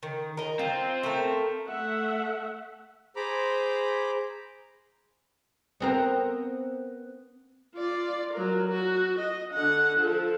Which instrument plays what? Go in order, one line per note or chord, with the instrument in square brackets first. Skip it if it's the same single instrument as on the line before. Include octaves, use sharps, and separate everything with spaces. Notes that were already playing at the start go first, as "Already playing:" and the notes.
[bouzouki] D#3
A#4 D#5
[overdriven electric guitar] C4 [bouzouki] F4
[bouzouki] A3 A#4
[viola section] A3 E5 F#5
[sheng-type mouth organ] G#4 C5 A#5 B5 D6
[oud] B3 C4 A#4
[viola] F4 D5
F#3 A#4
F#4
D#5
D3 F#5
F3 A4